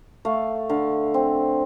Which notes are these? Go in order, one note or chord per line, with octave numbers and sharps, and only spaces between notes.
A3 F5
D3 F5
C4